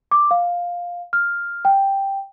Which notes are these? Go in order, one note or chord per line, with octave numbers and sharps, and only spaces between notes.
D6
F5
F6
G5